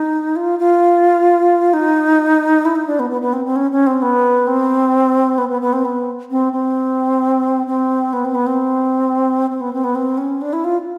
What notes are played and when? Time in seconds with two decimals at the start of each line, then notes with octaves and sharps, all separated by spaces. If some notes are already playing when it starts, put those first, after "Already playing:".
Already playing: D#4
0.36 F4
0.59 F4
1.73 D#4
2.65 E4
2.76 D#4
2.87 D4
2.99 B3
3.10 B3
3.22 B3
3.33 C4
3.45 C4
3.56 C#4
3.72 C#4
3.87 C4
4.02 B3
4.47 C4
5.38 B3
5.50 B3
5.61 B3
5.73 C4
5.85 B3
6.31 C4
6.53 C4
7.67 C4
8.13 B3
8.25 C4
8.35 B3
8.47 C4
9.50 C4
9.61 B3
9.73 C4
9.84 B3
9.95 C4
10.18 C#4
10.42 D4
10.53 E4
10.64 F4